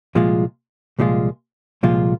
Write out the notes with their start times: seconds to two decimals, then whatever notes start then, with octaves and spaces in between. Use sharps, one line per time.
0.15 C2 A#2 F3 G#3 F4
0.99 C2 A#2 F3 G#3 F4
1.83 C2 A#2 F3 G#3 F4